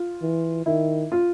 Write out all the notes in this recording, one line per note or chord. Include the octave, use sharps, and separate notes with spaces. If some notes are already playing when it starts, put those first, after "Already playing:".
Already playing: F4
E3
D#3 E4
F4